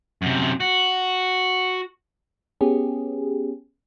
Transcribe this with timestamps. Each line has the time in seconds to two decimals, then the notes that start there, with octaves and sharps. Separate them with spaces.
0.22 F#2 C3
0.60 F#4
2.61 B3 C#4 G4 G#4